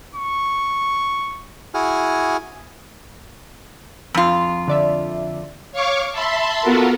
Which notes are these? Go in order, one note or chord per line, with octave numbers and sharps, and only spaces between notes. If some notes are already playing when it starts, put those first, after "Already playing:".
C#6
E4 F#4 G#4 G#5 F6
F2 F4
D3 D5 E5
C#5 F5 C#6 D6
E5 A5 B5 C6
B3 F4 F#4 A4 A#4